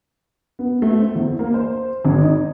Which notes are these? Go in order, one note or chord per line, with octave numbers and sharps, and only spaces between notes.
B3
A3
C4
E2
A#3
C5
G#1
D#4